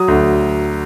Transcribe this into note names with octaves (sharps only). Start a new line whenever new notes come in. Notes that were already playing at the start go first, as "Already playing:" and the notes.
Already playing: F#3 D#6
D2